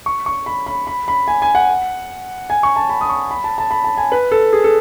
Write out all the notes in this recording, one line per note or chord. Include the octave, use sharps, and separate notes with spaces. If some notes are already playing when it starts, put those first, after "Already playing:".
C#6
C#6
B5
B5
B5
B5
G#5
G#5
F#5
G#5
C#6
A5
B5
D#6
C#6
B5
A5
A5
B5
A5
G#5
B4
A4
G#4
A4